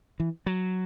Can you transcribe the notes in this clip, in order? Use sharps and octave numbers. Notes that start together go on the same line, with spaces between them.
E3
F#3